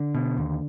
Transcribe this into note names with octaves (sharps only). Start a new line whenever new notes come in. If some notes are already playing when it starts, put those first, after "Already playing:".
Already playing: D3
B2
D#2